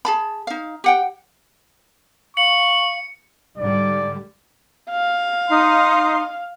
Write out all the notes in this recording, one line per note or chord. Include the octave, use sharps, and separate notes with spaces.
G#4 A5 B5
D#4 F5
G4 F#5 G5
F5 C#6 C#7 F#7
G#2 D3 G3 D5
F5
D#4 C6